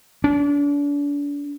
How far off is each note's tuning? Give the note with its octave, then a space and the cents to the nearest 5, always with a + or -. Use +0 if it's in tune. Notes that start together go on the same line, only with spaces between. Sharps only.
D4 -35